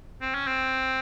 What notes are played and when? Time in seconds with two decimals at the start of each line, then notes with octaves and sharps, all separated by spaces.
0.21 C4
0.34 C#4
0.47 C4